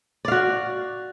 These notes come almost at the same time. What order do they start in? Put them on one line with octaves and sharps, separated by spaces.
D5 F5 F#4